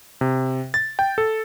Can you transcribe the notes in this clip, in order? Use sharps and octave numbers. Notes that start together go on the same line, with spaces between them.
C3
A6
G5
A4